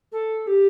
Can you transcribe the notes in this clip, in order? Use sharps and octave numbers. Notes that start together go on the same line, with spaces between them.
A4
G4